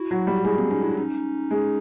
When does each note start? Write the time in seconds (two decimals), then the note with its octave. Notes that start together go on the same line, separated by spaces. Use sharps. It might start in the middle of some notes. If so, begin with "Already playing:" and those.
Already playing: E4 F#4
0.11 F#3
0.27 G3
0.45 G#3 E4 F#4
0.58 A#3 C4
0.71 C#4 D#4
0.84 D4 E4
0.97 C#4 D#4
1.51 G#3